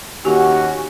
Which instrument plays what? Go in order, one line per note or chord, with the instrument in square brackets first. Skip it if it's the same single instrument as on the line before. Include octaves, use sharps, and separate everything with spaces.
[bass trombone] D#2 [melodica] C#4 [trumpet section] F#4 [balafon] G4